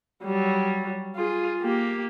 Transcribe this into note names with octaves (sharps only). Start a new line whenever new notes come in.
F#3 G3
F4 G#4
A#3 G4